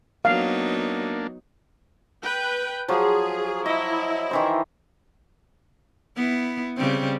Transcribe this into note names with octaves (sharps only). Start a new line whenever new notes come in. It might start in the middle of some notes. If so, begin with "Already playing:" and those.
F#3 A#3 B3 D4 D#4 F5
B4 G5
F3 F#3 G#4
E4 D#5
D#3 E3 C5
B3 E4
C#3 G3 C4